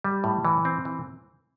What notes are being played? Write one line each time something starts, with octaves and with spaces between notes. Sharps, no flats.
G3
A2
E3
C4
E3